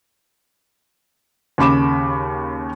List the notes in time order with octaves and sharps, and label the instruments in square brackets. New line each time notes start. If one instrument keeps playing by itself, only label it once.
[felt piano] D#2 C#3 B5 D6 E7